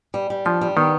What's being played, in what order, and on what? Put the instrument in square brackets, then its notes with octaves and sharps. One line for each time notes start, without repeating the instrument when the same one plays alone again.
[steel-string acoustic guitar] G3
G3
[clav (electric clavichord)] F3 [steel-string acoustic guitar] D4
[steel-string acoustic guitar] G3
[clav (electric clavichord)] D#3 [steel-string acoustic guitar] B3